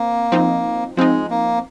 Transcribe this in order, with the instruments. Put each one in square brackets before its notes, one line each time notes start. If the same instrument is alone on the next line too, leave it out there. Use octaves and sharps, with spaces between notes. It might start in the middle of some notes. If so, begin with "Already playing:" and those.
Already playing: [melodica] A#3 [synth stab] C4
[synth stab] F3 C4 D#4
[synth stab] F3 C4 D#4 [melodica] G#3
[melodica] A#3